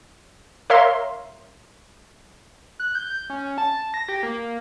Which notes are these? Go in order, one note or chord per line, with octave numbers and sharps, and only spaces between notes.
A#4 C#5 E5 F5 C6
F#6
G6
C#4
A5
A#6
G4
A#3